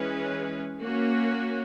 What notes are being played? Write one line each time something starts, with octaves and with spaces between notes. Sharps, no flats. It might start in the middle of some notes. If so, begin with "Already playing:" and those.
Already playing: E3 G#3 C#4 G#4 B4
A#3 C#4 F#4